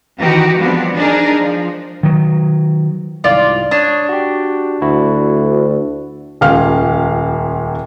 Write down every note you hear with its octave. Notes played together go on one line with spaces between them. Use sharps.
D#3 E3 D#4 F#4 G4
F3 G3 G#3 B3 C4 D4
D4 D#4 G#4 A#4
F3
D#3 F#3
C2 G#2 F4 D5
D4 C#5 D#6
F#4 G4
D2 E4 F#4
D#1 C#2 F5 F6